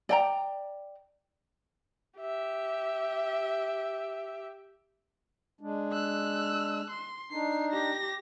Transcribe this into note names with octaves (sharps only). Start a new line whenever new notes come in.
D5 G5 A#5
G4 E5
G#3 D4
E6 F#6
C6
D4 D#4 C7
G4 A#6